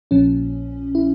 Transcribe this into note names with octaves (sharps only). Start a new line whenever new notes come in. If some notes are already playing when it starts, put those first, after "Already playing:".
A#1 A#2 F3 C#4
E4